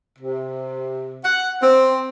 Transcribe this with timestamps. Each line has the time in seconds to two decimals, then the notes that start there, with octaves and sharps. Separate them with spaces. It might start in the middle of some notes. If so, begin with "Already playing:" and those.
0.18 C3
1.23 F#5
1.61 C4